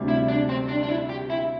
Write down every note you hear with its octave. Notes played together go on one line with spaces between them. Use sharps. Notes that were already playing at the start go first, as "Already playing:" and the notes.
Already playing: D2 C3 G3
E4
D4
C4
D4
D4
E4
G4
E4